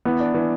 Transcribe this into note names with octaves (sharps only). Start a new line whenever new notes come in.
E3 B3
D4
E3